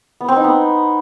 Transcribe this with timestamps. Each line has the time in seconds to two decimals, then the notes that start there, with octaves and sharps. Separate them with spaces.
0.21 B3
0.28 C4
0.36 D#4
0.44 B3